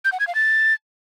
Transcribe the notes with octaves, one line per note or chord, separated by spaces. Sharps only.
G6
F#5
G#6
F5
A6